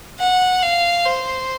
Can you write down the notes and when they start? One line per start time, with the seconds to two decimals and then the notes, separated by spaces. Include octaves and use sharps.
0.20 F#5
0.63 F5
1.06 C5